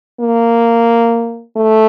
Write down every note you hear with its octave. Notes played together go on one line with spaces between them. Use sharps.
A#3
A3